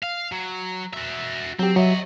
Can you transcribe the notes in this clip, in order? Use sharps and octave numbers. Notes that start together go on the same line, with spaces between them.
F5
F#3
F#4 E5
F#3 C4 G4
F#3 C#5 D#5 E5